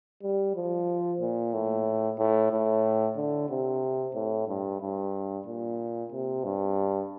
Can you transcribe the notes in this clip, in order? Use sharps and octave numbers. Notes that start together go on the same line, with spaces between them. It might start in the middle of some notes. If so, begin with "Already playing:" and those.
G3
F3
A#2
A2
A2
A2
D3
C3
A2
G2
G2
A#2
C3
G2